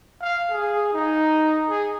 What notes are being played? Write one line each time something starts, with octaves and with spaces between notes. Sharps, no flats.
F5
G#4
D#4
G#4